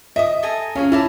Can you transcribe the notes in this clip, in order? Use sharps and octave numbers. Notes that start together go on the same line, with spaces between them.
D#5 E5 D#6
A4 G#5 A#5
C#4 G#4 C#5 F5
E4 A#4 D5 A5